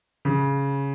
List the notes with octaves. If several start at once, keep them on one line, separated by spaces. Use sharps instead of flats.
C#3